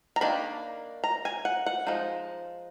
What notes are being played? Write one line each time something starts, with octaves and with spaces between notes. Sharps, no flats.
A#5
D#3 A#3 D4 B5
A#5
G#5
F#5
F#5
F3 G#3 D#4